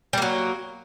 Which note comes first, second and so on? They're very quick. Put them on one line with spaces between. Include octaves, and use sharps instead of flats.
G3 A#3 F#3